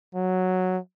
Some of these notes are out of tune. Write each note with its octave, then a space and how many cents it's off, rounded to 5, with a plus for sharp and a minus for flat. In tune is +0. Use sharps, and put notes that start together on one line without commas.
F#3 -5